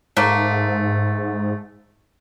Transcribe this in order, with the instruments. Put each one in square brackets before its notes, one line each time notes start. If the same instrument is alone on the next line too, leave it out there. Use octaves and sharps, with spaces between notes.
[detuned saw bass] G#2 [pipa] A3 A#3